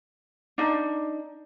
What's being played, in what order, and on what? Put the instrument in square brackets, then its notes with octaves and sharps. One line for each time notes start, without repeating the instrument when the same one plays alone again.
[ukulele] D4 D#4